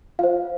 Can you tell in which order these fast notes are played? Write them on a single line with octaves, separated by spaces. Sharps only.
F4 F5 C5